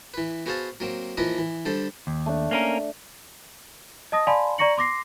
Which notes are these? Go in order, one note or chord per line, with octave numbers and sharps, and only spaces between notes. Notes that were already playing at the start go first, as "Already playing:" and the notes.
E3 B4
B3 F#4 G#4 C5 F5 A5
F#3 A#3 C4
E3 F3 A#3 B4 D#5
E3
D3 G3 A4 C5
D#2
A3 D4
A#3 C#4 A#4
D#5 A5 D#6 A#6
D5 F5 G#5 A5 B5 C6
D5 A#5 C#6 A#6 C#7 F#7
C6 D6 A#6 C7